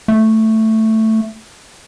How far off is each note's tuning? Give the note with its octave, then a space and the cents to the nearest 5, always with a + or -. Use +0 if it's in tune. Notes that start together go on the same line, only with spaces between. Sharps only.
A3 +5